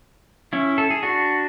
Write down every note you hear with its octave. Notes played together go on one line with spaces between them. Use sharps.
C#4 E4
A4
G#4
D4 F#4